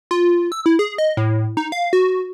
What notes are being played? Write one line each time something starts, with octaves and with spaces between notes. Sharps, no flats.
F4
E6
E4
G#4
D#5
A2
D#4
F5
F#4